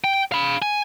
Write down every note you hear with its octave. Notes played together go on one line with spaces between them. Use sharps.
G5
F5 B5
G#5